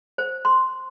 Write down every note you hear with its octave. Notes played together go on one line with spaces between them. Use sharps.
C5
C6